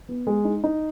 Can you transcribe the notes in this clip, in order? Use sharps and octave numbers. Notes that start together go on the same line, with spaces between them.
B3
G#3
D#4
D#4